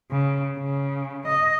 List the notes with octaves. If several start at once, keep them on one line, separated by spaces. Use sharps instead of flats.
C#3
C#3
D#5